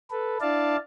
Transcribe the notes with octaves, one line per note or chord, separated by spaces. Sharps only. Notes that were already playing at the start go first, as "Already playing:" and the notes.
A4 B4
D4 E4 D5 F5 A5